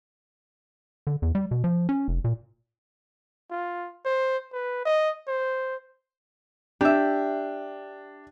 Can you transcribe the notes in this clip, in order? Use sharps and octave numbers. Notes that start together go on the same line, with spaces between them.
D3
E2
G3
B2
F3
C#4
F1
A#2
F4
C5
B4
D#5
C5
D4 G4 E5